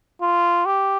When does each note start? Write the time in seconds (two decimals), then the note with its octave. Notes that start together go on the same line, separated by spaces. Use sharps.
0.22 F4
0.66 G4